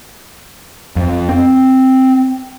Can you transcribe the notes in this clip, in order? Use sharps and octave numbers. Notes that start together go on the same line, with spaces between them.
F2
C4